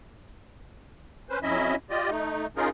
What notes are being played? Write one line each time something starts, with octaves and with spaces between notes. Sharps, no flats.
C#4 B4 C5
F2 F#3 C#4 E4 D#5 E5
F4 G4 D5 D#5
A3 D#4
C#4 D#4 F4 G#4 A#4